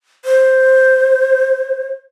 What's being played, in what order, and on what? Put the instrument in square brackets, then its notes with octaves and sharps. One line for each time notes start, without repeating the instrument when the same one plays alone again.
[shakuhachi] C5